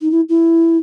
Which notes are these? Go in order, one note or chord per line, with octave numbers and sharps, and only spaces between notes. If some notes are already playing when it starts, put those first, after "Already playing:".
D#4
E4
E4